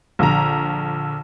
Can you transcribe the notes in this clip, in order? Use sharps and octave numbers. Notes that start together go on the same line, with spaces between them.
A#1 D3 A#5